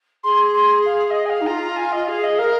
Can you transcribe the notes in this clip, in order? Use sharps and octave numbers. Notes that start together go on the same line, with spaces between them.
G#4 C6
C6
F5
F5
D#5
G#5
F5
D#4
F4 A#5
A#5
G#5
D#5
G#4 F5
D#5
A#4 F5